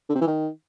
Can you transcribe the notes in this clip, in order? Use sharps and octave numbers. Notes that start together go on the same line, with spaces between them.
D3
C3
E3
D#3